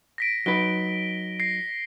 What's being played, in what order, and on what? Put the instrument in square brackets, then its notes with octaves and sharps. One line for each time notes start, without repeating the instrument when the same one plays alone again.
[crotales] A#6 B6 D7
[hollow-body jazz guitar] F#3 D#4 B4 [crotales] G7
[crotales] A#6 C7